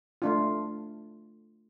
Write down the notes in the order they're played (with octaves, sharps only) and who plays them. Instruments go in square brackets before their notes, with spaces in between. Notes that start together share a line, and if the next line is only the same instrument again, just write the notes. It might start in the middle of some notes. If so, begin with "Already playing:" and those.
[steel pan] A3 D4 F4